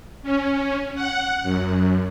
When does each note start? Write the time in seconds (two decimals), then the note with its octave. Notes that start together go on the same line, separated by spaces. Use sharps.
0.23 C#4
0.95 F#5
1.43 F#2